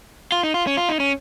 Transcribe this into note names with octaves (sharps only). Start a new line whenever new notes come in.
F4
D#4
F4
C#4
F4
D#4
C#4